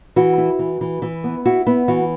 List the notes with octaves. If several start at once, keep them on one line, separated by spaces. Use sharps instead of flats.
E3 F#4
E4
E3
E3
E3
B3
E4 F#4
B3 E4
E3 F#4